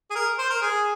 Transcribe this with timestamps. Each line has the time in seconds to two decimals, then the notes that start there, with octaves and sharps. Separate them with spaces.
0.11 G#4
0.16 A#4
0.39 C5
0.50 A#4
0.62 G#4